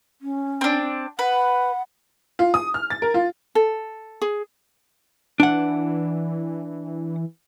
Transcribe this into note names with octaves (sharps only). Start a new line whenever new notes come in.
C#4
C4 D4
B4 F#5
F4
D#6
F6
A6
A#4
F4
A4
G#4
E3 D4 F#5